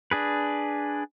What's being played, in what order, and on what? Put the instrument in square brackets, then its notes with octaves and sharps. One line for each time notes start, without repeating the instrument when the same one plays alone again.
[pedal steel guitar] D4 G#4 B4